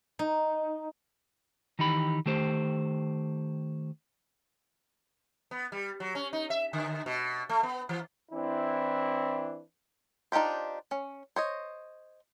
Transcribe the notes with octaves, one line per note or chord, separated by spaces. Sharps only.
D#4
D#3 E3 D#4 G4 B5
D#3 A3 G4 C5
B3
G3
F#3
C#4
D#4
E5
D3
B2
A3
B3
E3
E3 C4 D4 E4
D4 D#4 F4 G4 C5
C#4
C5 C#5 D#5